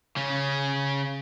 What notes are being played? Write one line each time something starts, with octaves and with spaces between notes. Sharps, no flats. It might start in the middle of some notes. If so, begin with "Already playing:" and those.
C#3 C#4